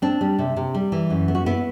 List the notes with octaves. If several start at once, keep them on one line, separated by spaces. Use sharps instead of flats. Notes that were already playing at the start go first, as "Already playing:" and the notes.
C4 D4
G3
C3
C3
G3
E3
F#2
B3
F#4
B3 E4